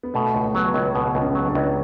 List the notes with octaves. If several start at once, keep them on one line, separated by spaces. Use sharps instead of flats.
B3
B2 A3
C#2 A3
F#3 B3
C#2 B3
B2 B3
C#2
C#4
F#3
D4
C#2